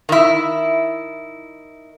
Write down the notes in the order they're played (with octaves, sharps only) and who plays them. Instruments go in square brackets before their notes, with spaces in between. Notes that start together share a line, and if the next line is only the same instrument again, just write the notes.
[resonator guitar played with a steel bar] D#3 E4